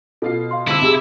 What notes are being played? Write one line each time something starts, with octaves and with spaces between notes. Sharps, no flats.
B2 F4 A4 C7
F5 C6
D3 C4 E4 D6 E6
C3 G#4